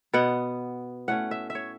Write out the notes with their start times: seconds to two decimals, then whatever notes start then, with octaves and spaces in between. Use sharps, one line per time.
0.13 B2 B3 F#5
1.08 A2 A3 C#4 F#5
1.31 E5
1.50 E5
1.55 C#5